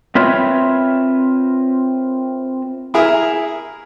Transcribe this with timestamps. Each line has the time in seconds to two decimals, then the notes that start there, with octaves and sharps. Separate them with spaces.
0.15 C4 F4 A#4 B4 C#5 E5
2.94 E4 G#4 A#4 E5